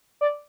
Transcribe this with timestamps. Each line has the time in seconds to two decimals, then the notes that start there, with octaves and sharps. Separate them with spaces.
0.21 D5